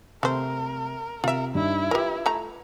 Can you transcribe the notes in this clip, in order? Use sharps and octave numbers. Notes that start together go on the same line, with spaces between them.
C3 A3 A#4 C5
C3 F4 A#4 E5
G2 D#4 E4
F4 G4 A#4 B4
A3 A#5